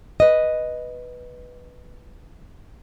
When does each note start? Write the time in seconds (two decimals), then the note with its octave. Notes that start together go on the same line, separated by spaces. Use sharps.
0.20 B4 D#5